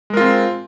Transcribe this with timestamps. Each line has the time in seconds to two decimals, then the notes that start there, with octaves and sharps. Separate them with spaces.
0.10 G#3
0.14 A#4
0.17 F4
0.20 C4